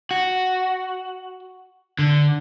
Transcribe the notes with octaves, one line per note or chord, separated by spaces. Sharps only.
F#4
D3